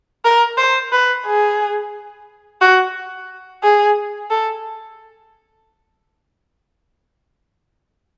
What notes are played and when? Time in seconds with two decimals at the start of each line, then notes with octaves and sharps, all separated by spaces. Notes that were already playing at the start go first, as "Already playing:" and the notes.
0.25 A#4
0.58 C5
0.92 B4
1.26 G#4
2.61 F#4
3.63 G#4
4.30 A4